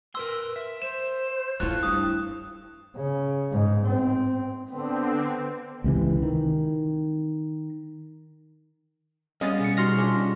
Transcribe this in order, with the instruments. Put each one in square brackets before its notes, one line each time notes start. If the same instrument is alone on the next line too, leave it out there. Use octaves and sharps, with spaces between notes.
[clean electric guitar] A#4 B4 C6 [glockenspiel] E6
[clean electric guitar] E5
[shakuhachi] C5 [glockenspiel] E7
[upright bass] A3 E4 [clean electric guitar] F4 A4 C#5 [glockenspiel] F#6
[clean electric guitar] G2 [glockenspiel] D#6
[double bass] C#3
G#2
C4
[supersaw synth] D3 C4 [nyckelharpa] B3
[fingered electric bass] C#2 C3 E3
D#3
[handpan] G3 [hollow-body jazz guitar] G#3 B3 C#4 [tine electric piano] D#5 F5 A6
[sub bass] B2 [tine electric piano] G#4 C#7
[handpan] G3 D#4 F#4 [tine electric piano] C6 F6 A#6
[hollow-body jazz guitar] C#4 D4 [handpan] F4 G#4